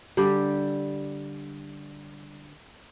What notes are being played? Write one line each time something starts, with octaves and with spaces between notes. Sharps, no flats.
D3 G3 G4